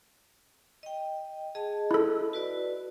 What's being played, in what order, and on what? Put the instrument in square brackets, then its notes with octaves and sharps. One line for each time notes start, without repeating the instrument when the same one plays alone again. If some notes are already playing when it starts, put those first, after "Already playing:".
[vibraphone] D#5 G5
G#4 D#5 A5
[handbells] E4 A4
[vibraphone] F#4 B4 D5